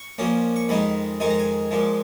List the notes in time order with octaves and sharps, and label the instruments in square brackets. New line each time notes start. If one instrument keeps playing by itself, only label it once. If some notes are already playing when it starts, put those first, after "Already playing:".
Already playing: [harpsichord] C#6
A#2 F3 A#3 C#4
C#6
F2 D#3 G#3 D#4 B5
F2 D#3 G#3 D#4 G#5
A#5
G#5
A#2 F3 G#3